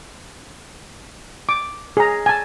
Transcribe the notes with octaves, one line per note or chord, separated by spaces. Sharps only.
D6
G#4 A#5
G#5 A5